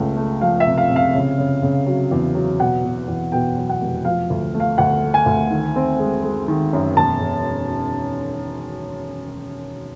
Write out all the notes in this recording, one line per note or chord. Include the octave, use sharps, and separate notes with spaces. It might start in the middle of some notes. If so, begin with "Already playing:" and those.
Already playing: C#2 A3
A3
F3 F5
E5
C3
F5
C3
F5
C#3
C#3
C#3
F#3
E2
F#3
B2 F#5
B2
E2
B2 G5
F#3
F#5
F1
F3 F5
D2
A3
F5
D2 F#5
A3
G#5
D2
D#3
C4
G#3
G#3
D#3
F#2
E1 A5
E1